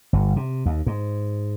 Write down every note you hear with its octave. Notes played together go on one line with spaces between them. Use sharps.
G1
C3
D#2
G#2